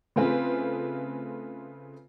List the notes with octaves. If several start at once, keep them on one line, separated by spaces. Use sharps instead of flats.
C#3 A3 C4 F4 G#4 B4